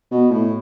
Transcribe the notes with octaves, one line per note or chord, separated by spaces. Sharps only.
B2
A2